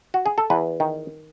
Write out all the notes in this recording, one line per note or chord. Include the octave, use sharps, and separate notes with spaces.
F#4
G#4
A4
E2 B4
D#3